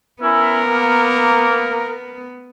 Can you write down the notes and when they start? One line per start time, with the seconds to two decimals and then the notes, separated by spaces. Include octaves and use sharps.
0.22 B3 C#4 E4 A#4
0.66 A#3